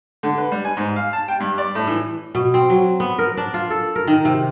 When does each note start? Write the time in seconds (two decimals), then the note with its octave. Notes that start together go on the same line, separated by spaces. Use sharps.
0.23 D3
0.38 B4
0.52 G3
0.65 G#5
0.77 G#2
0.96 F5
1.13 A5
1.28 G5
1.40 G2
1.58 D5
1.75 A2
1.87 E3
2.35 B2
2.54 C4
2.70 F#3
3.00 B3
3.19 A#4
3.37 D4
3.54 F4
3.70 A4
3.96 A#4
4.07 D#3
4.25 C3